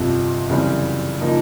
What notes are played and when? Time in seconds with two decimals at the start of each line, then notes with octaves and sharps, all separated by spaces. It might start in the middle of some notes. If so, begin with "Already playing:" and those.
Already playing: G1 F2 C3 F3
0.49 F#2 C#3 E3 G3 C4
1.21 C#3 F3 A#3 D#4